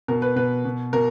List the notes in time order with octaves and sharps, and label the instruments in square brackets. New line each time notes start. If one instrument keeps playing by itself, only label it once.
[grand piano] B2 A#4
B4
B2 B4
B2
B2 A#4